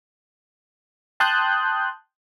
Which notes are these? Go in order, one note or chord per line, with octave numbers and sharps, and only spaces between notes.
G5 A5 C6 D#6 F#6 G6